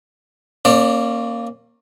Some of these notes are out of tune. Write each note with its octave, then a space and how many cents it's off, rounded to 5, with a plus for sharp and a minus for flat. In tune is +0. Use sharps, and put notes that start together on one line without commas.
A#3 -5 C#4 -30 D5 +15